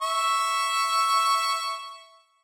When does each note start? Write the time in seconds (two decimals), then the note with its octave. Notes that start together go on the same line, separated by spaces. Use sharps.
0.02 E5 C#6